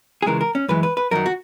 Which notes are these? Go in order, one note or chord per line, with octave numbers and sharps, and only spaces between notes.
G#4
C#2 C#3 E3 G#3 A#4
A#4
C#4
F#2 E3 G#3 B4
B4
B4
F#2 D#3 F#3 A#4
F#4